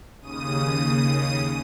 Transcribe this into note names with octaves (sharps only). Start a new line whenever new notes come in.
D#2 C#3 D#6 D#7